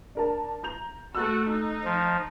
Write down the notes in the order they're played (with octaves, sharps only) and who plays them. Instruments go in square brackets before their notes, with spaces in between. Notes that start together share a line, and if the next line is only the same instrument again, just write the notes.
[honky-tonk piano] D4 A#4 A5
A#5 G6 F7
[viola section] A3 F#4 [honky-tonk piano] E6 F#6 A6
[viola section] D#4
[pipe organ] F3